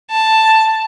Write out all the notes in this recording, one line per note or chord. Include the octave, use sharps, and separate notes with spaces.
A5